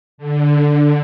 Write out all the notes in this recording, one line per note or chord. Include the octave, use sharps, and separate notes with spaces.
D3